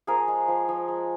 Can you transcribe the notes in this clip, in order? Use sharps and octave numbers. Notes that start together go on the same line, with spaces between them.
F3 G#4 A#4
G#3
F3
F3
G#3